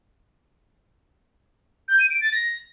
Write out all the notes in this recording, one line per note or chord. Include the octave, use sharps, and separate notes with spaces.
G6
D#7
D7
A6
A#6